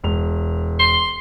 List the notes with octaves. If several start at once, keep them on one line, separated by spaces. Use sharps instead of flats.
E1 F7
C6